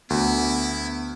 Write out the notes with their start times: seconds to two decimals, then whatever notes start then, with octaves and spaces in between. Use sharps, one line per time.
0.10 D2 B3 E4